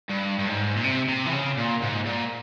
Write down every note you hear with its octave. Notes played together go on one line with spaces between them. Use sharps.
G2
G2
G#2
A#2
C3
C3
E3
C#3
A#2
G#2
A#2